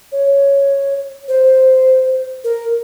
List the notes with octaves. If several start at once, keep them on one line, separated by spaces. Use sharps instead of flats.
C#5
C5
A#4